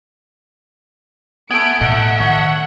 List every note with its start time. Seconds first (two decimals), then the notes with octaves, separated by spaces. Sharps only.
1.50 A3 B3 G#5 D7
1.81 A2 A3 D#5 E5 F#5
2.20 D#3 C#5 F#5